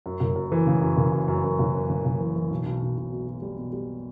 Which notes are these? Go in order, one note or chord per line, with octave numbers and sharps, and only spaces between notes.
F#2
F#1
F#2
E3
C#3
F#2
F#1
F#2
F#2
F#2
F#1
F#2
C#3
F#1
E3
E3
B1
B1
B1
B1
B2
B2
G3
B2
G3